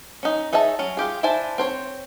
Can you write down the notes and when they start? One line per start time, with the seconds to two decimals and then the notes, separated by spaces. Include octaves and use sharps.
0.23 C#4 D#4
0.53 D#4 G#4 C#5 E5 A5
0.79 F#3 C#4
0.97 F4 G4 G#4
1.23 D4 E4 C5 G#5 A5
1.58 C4 C5 C#5